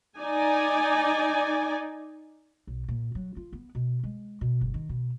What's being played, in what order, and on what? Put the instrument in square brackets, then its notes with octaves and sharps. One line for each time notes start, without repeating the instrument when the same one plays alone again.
[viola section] D#4 D5 G#5
[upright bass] B1
A#2
F#3
F4
B3
B2
G#3
B2
G1
D#3
B2